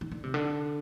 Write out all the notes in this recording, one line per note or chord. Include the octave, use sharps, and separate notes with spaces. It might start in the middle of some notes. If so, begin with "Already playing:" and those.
D#3
D3
C3
D3